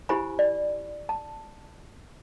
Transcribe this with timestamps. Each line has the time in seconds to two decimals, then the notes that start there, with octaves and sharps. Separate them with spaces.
0.09 E4 G4 C5 G#5 B5
0.39 D5
1.09 A5